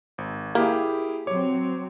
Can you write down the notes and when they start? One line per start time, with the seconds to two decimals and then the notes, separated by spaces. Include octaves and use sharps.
0.18 G#1
0.55 A#3 E4 G4 G#4
1.27 F#3 C4 C#5 D6